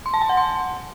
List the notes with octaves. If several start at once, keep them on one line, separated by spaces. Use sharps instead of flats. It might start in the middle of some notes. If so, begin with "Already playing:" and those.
C6
A5
G#5
F#5
C6